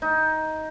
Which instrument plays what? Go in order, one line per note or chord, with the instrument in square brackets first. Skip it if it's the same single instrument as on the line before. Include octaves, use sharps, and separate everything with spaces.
[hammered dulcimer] D#4